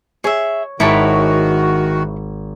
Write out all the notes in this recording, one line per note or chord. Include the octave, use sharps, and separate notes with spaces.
G#4 C#5 E5
G#1 D#3 E4 F#4 C#5 A5 B6 D7